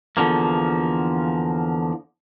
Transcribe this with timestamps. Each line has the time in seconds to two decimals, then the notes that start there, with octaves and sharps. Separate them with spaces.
0.17 E2 D3 F3 A#3